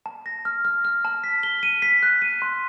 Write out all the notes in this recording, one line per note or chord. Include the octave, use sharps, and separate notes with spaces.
A5
A#6
F6
F6
F6
A5
B6
G7
D#7
B6
F#6
D#7
C6